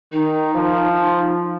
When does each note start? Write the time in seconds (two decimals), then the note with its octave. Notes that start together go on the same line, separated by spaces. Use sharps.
0.13 D#3 D#4
0.55 F3